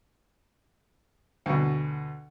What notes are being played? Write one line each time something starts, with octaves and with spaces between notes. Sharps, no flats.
D2 B2